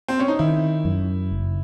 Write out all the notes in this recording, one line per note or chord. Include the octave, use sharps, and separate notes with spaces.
C4
C#4
D#4
D#3 E4
F#2
F#1